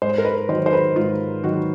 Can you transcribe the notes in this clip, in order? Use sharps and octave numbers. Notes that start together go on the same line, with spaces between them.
G#2 C5
A#4
B4
D#3 F#3 C5
C5
B4
G#2 F4
D#3 F#3 F#4